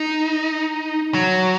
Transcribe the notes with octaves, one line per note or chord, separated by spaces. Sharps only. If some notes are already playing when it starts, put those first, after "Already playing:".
Already playing: D#4
F#3